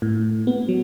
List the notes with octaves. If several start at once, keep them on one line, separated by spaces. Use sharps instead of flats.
A2
B3
F#3